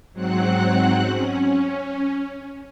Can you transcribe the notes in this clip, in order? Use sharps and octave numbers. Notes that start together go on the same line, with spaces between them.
G#2 F#3 C4 F#5 F#6
C#4